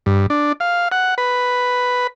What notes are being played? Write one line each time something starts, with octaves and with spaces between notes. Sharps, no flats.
G2
D4
F5
F#5
B4